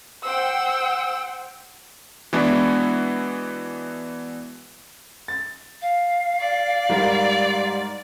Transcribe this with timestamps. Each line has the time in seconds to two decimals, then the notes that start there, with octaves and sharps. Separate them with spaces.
0.23 C5 F#5 G5 E6
2.33 E3 G#3 B3 D4 E4 F#4
5.28 A6
5.82 F5
6.40 D5
6.89 G#2 G3 A#4